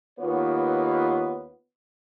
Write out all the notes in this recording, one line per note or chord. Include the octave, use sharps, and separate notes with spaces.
D#2 B3 F4 B4 C#5